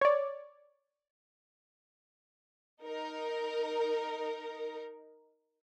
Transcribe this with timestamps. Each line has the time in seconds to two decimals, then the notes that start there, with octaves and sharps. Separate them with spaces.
0.01 C#5 D5
2.83 D#4 A#4